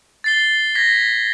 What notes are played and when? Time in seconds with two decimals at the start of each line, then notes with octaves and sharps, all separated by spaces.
0.24 A6 C7 G7
0.75 G#6 A#6 B6